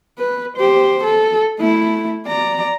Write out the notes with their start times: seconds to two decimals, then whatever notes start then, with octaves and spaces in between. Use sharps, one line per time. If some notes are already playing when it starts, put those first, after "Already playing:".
0.19 B4
0.57 G4 C5
1.04 A4
1.60 A3 E4
2.27 D5 A#5